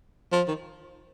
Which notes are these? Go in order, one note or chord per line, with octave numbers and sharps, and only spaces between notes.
F3
D#3